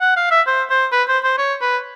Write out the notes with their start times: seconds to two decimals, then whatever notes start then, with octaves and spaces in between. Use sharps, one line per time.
0.01 F#5
0.16 F5
0.31 E5
0.47 C5
0.70 C5
0.92 B4
1.08 C5
1.24 C5
1.38 C#5
1.61 B4